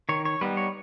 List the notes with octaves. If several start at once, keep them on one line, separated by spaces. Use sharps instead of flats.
D#3 C#5
C#5
G3 B3 D#4 B4
C#5